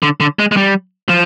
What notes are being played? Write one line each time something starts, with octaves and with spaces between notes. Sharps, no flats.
D3
D3
G#3
G#3
G3
F3